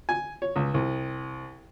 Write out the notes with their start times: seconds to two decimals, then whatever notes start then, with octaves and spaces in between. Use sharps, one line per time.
0.09 G#5
0.42 C#5
0.56 C#2
0.74 C2